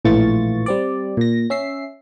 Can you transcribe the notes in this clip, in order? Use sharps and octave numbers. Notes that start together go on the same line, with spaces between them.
A#1 A2 E3 F4 C#6 A6
G3 C4 D5
A#2 A#6
C#4 E5 C7